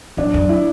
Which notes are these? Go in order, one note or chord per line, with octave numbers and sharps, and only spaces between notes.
F#2 D4
F#2
E4